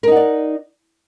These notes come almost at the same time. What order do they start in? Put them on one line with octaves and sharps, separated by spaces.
A#4 D#4 F#5 D5